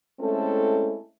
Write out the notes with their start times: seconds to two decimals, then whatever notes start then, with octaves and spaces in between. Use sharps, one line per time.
0.20 G#3 A3 C4 C#4 E4 A4